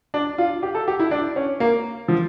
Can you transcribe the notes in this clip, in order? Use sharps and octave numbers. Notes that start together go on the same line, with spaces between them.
D4
F4
G4
A4
G4
E4
D4
C#4
A#3
F3